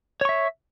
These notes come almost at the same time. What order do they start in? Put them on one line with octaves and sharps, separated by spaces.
C#5 C#6 E5